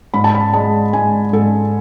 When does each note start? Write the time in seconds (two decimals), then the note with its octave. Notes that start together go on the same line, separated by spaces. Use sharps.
0.14 G#2 B5
0.24 A5
0.35 B5
0.54 G#3 A5
0.93 G#2 G#5
1.33 G#2 A4